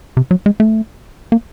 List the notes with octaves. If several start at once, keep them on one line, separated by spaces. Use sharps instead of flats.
C3
F#3
G#3
A3
A#3